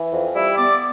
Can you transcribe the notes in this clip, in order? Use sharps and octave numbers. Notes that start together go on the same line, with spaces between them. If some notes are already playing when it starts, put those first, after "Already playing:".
Already playing: E3
F2
G3 E4 E5
B3 D5 D6